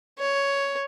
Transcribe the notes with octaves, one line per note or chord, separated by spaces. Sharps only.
C#5